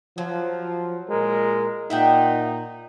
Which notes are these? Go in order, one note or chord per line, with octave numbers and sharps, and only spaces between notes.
F3 F#3
A#2 G#3 A#4
A#2 D#4 E5 F#5 G5